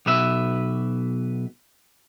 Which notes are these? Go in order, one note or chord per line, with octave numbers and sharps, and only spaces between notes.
B1 B2 B4 E5